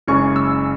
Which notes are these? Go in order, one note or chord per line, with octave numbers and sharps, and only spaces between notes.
F#1 F#2 C#3 G#3 C#4 C#6
E6